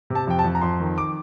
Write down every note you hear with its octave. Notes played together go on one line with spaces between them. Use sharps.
C3
A5
F2 G5
A5
F2
A#5
F2 C6
D#3
D6